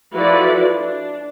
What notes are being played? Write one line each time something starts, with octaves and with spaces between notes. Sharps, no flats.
F3 E4 F#4 A4 B4 D5
D4